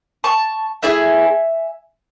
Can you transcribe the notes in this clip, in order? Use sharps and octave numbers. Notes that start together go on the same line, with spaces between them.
A5 C#6
A3 E4 G#4 E5 G#5